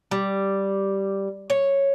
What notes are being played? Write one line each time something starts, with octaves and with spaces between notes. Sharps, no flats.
G3
C#5